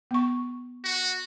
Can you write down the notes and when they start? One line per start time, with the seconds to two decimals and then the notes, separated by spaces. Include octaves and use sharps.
0.11 B3 C#6
0.84 F#4